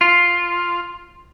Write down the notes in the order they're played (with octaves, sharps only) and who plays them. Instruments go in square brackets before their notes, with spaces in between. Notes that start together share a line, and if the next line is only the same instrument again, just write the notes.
[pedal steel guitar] F4